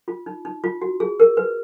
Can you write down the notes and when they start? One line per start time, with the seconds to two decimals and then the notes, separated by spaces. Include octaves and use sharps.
0.08 F4
0.26 D#4
0.45 D#4
0.64 F4
0.82 F#4
1.00 G#4
1.20 A#4
1.37 B4